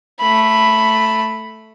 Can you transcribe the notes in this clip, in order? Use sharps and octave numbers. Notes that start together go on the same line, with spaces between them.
A3 B5